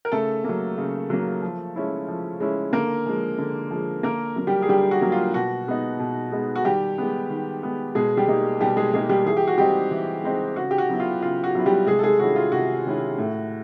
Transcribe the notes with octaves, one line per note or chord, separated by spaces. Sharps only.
A#4
C#3 A3 A4
F#3 A#3
C#3
F#3 A#3
F3
G#3 C#4 E4
F3
G#3 C#4 E4
D3 A#3 A#4
F3 G#3
D3
F3 G#3
D3 A#3 A#4
F#3 A#3
G3 G4
G#4
D3 G3 G4
F#4
F#3 A#3
F4
B2 F#4
G#3 B3 D#4
B2
G#3 B3 D#4
F#4
D#3 G3 G4
G#3 B3
D#3
G#3 B3
B2 G#3 G#4
G3 G4
G3 A#3 D#4
B2 G3 G4
G#3 G#4
G3 G#3 A#3 D#4 G#4
G3 G4
E3 G#4
G4
F#4
G3 G#3 C4 D#4 G4
E3
G#3 C4 D#4
C#3 F#4
G4
F#4
F#3 B3 E4
F4
C#3 F4
F#4
F#3 B3 E4
G3 G4
C3 G#3 G#4
A4
G#3 G#4
D#3 G#3 C#4 E4 F#4
F4
C3 F#4
D#3 G#3 C#4 E4
A2